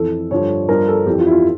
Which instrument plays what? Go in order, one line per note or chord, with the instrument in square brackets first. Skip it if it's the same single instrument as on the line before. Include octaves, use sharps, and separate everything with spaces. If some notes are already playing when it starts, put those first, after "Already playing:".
Already playing: [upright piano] F2 E3 A4
G2 D3 F3 C#5
G2 F3 A#4
A4
F2 E3 G4
F4
E4
F4